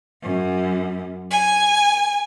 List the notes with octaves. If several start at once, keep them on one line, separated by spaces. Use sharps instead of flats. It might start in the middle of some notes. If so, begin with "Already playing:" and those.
F#2
G#5